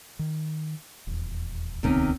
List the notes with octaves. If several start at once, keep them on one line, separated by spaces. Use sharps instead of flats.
D#3
D#1 E2
D#1 C#2 C3 D#3 B3 C#4